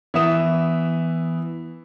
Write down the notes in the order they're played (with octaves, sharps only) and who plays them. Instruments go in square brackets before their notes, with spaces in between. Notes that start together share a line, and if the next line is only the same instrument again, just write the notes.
[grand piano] E3 B3 E5 D#6 E7